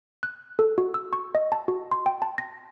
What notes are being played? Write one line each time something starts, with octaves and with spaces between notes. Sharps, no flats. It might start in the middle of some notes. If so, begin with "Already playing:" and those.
F#6
A4
F#4
E6
C#6
D#5
A5
F#4
C6
G5
A5
A#6